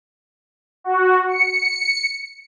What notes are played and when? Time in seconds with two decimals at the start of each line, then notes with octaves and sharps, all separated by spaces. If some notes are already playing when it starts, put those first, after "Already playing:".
0.84 F#4
1.29 C#7